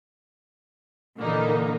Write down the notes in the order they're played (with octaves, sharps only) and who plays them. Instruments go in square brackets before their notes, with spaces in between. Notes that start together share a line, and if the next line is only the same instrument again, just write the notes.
[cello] A#2 E3 [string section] D3 A#3 D#4